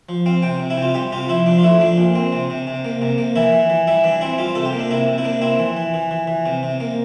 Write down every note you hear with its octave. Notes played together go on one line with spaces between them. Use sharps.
F3
C4 F5
C3 G5
C3
E4
C3 F4
G3 G4
C3 F4
F3 E4
F3 D4
F4
A3 E4
F3 D4
A#2
C4
C3
C3
C3
A#3
C3
A#3
E3 E4
E3
E3
G3 E4
E3 D4
C4 E4
G3 F4
C3 A4
G4
A#3
D4
C3 E4
C3
E4
A#3 D4
C4 E4
E3
E3
E3
E3
E3
C3
C3
A#3